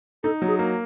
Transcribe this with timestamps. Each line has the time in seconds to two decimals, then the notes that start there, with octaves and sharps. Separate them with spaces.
0.23 D#4 A4
0.42 F#3
0.48 G#4
0.59 A#3